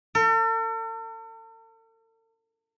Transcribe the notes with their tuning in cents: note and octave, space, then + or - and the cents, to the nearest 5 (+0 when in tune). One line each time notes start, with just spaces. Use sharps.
A4 +45